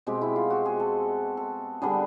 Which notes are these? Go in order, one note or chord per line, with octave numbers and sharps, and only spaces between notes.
B2 G#3 C4 G4
E4
F4
F#4
G#4
A4
A4
D3 G3 B3 D4 G#4